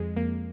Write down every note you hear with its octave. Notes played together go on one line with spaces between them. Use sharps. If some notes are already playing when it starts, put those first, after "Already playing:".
Already playing: F2 G#3
F2 A#3